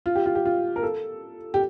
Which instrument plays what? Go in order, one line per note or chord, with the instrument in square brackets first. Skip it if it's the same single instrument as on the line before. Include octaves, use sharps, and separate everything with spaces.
[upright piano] F4
G4
F4
G4
F4
A#4
A4
G4